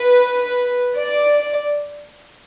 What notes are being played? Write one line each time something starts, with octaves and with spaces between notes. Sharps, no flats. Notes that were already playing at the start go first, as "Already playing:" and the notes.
Already playing: B4
D5